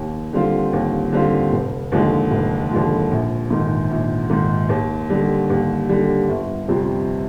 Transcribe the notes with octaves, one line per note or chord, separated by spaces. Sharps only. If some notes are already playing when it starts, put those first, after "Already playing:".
Already playing: D#2
D3 G3 C4 F4
D#2
D3 G3 C4 F4
F1
D#2 D3 F3 G#3
F1
D#2 D3 F3 G#3
A#1
G#2 D#3
A#1
G#2 D#3
D#2
D3 G3
D#2
D3 G3
G1
F2 C3 G3 C4